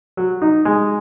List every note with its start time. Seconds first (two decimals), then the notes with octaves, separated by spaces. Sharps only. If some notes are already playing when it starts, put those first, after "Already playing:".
0.17 F#3
0.42 D#4
0.65 G#3